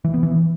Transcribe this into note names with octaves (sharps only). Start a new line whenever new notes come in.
E3
B3
E3